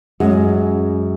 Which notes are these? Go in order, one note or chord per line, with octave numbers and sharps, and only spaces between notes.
F#2 G#3